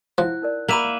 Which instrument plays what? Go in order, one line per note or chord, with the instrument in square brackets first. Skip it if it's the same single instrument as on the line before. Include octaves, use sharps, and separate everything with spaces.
[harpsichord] F3 [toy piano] E4 F#5 [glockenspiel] F#6
[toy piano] D#4 A#4 D5
[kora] A#3 E5 [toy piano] F#5 B5 [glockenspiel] A#5 D#7 F#7